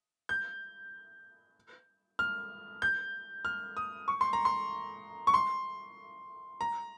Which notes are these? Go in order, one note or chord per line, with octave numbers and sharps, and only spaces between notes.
G6
F6
G6
F6
D#6
C#6
C6
A#5
C6
C#6
C6
A#5